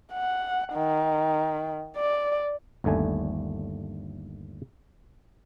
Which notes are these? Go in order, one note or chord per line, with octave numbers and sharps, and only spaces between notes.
F#5
D#3
D5
G1 D#2 D3 A3 G#5